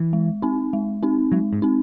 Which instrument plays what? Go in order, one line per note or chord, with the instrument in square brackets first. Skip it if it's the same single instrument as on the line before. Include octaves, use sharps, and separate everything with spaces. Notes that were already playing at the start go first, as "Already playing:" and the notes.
Already playing: [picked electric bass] E3
[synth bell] G#3
C4 D#4
G#3
C4 D#4
[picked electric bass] F#3 [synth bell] G#3
[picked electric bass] G#2
[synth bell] C4 D#4